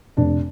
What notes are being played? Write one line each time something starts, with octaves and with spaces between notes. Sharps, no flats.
F1 D4